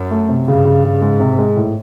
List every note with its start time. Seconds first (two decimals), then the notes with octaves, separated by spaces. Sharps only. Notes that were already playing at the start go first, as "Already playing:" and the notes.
Already playing: F#2
0.11 A3
0.29 C3
0.48 G2 C#3
0.65 C#3
0.84 C#3
1.02 G#2 G#3
1.20 C3
1.38 G#3
1.56 A2